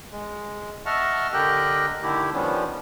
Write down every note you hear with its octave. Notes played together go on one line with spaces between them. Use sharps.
G#3
D#5 E5 F#5 A5 C#6 F6
D3 G4 A#4 D#5 G5 F#6
D3 D#3 A3 E4 G4
D#3 F3 G3 B3 C#4 D4